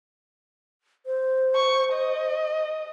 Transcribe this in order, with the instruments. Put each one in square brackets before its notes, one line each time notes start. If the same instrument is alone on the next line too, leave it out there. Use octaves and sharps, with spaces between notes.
[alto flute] C5
[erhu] C#6
D#5